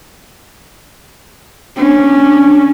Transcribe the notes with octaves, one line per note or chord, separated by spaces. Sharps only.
C#4 D4